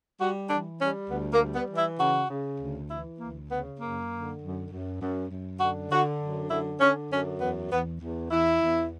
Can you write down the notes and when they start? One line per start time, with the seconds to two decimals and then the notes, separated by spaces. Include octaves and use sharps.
0.20 G3 F#4
0.49 E3 D4
0.81 G3 C#4
1.10 D2 B3
1.33 A#3
1.40 G3
1.55 B3
1.71 E3
1.78 E4
2.00 C#3 F#4
2.30 C#3
2.61 D2
2.90 E3 E4
3.20 D2 A#3
3.50 C#3 B3
3.80 F#2 A#3
4.11 D3
4.41 F#2
4.71 F#2
5.01 F#2
5.31 F#2
5.60 D3 F#4
5.91 D3 F#4
6.20 F#2
6.51 D3 E4
6.81 D3 C#4
7.11 F#2 C#4
7.40 E2 B3
7.71 E2 B3
8.01 E2
8.30 E2 E4
8.61 E2